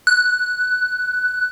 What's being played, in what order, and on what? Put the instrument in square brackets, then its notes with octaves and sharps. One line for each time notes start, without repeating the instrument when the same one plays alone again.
[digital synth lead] F#6